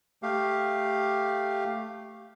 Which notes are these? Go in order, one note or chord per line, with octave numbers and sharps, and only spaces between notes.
A3 G4 F5